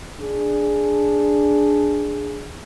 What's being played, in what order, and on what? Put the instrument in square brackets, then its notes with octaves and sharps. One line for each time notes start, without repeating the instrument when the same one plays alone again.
[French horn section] D4 G#4